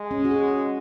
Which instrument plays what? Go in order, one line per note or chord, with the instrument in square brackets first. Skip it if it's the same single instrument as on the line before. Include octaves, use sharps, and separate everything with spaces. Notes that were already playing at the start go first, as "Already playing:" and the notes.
Already playing: [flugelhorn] G#3
[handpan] C#4
F#4
G#4